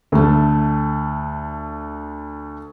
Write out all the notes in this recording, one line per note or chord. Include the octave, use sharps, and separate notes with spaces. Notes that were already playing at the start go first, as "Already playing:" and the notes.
D2 A3